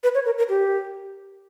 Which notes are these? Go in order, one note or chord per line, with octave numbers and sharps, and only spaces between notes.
B4
C#5
A#4
A#4
G4